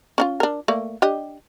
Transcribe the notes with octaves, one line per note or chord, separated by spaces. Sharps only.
C#4 D#4 F4
D4 A#4
A3 A#3 D5
D4 G4 D#5